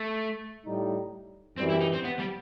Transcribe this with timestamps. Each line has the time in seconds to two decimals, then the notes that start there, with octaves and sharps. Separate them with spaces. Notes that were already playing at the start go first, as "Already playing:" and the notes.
Already playing: A3
0.65 A2 G3 D#4
1.57 F#2 E3 G3 C4
1.70 E4
1.81 D#4
1.93 C4
2.04 B3
2.19 G3